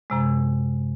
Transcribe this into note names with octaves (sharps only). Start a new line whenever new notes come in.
F#2 C3 G#3